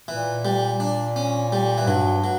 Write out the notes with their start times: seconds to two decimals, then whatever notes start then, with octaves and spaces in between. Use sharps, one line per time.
0.08 A#2 E3
0.45 G3
0.80 D4
1.16 C#4
1.52 G3
1.78 E3
1.87 G2 F#3
2.24 F#3